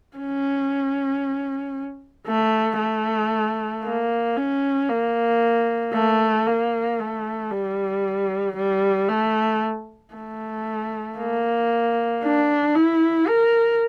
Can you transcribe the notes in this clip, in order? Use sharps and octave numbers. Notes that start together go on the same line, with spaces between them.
C#4
A3
A3
A#3
C#4
A#3
A3
A#3
A3
G3
G3
A3
A3
A#3
D4
E4
A#4